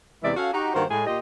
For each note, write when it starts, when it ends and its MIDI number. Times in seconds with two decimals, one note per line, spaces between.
0.23 0.31 40
0.23 0.31 48
0.23 0.31 52
0.23 0.31 56
0.23 0.31 74
0.23 0.31 76
0.36 0.49 61
0.36 0.49 66
0.36 0.49 69
0.36 0.49 77
0.53 0.73 63
0.53 0.73 66
0.53 0.73 67
0.74 0.84 43
0.74 0.84 51
0.74 0.84 58
0.74 0.84 66
0.74 0.84 72
0.90 1.02 45
0.90 1.02 56
0.90 1.02 68
1.07 1.19 46
1.07 1.19 65
1.07 1.19 67
1.07 1.19 75